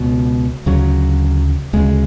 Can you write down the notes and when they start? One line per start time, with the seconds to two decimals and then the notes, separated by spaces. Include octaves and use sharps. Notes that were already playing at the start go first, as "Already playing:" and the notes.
Already playing: C#2 B2
0.66 D2 C#3 F#3
1.73 D2 C#3 G#3